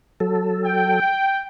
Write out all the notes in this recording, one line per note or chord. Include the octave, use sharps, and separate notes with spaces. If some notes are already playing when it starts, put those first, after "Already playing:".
F#3 A4
G5